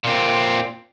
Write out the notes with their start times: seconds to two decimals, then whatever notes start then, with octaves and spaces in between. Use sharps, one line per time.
0.05 A#2 C4